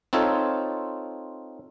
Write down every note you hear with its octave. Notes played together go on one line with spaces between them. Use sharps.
C4 D#4 F4 A4 C#5